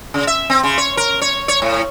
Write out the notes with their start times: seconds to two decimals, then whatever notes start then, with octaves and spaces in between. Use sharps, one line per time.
0.14 C#3
0.27 E5
0.50 C4
0.63 C#3
0.78 C#5
0.97 A#4
1.22 C#5
1.48 C#5
1.62 A2